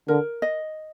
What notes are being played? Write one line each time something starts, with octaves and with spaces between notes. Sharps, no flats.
D3 A#4
D#5